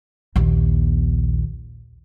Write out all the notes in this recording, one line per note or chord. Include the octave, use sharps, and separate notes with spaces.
A#1 D#2